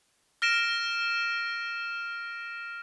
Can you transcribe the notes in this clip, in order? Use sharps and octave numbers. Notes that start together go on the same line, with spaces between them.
F6 A#6 D7 E7